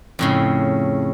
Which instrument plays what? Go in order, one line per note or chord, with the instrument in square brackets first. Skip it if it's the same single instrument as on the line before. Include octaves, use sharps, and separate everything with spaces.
[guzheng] F2 A2 C#3